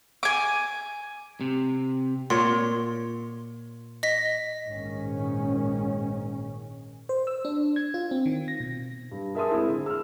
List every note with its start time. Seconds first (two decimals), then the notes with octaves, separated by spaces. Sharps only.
0.23 G#5 D6
1.41 C3
2.30 A#2 C#5 C6
4.03 D#5 A#6 B6
4.67 A#1 G#2 D#3 C#4
7.09 C5
7.27 E6
7.45 D4
7.76 G#6
7.94 F4
8.11 C4
8.26 D#3
8.48 A#6
8.60 B2
9.12 G2
9.35 G#4 A#4 E5 A5 C6 D#6
9.51 G#3 C4 E4
9.69 D3
9.86 E6 F6